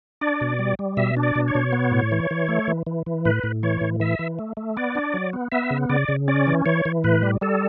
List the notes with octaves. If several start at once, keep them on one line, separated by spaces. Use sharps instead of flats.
D4 D5
B2
G3
G3
B2 E5
D4
D5
B2
C#5
B2
B3
A2
E3
E3
A3
E3
E3
E3
A2 B4
A2
E3 C#5
A2
E3 E5
E3
A3
A3
B3 D5
D4
F#3
B3
B3 E5
C#3
C#3 D5
C#3
C#4 D5
E3
E3 C#5
E3
A2 B4
G3
G3 A4